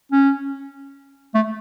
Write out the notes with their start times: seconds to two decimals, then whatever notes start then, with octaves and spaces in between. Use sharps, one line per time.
0.11 C#4
1.34 A3